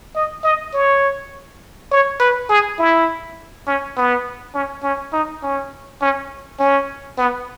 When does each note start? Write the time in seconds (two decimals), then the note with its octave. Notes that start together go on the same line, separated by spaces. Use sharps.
0.16 D#5
0.44 D#5
0.74 C#5
1.91 C#5
2.20 B4
2.50 G#4
2.79 E4
3.67 C#4
3.97 B3
4.54 C#4
4.83 C#4
5.13 D#4
5.43 C#4
6.01 C#4
6.60 C#4
7.18 B3